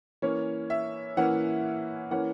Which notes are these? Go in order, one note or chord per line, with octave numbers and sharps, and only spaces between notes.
E3 A#3 C#4 C#5
E5
E3 A#3 C#4 F#5
E3 A#3 C#4 F#5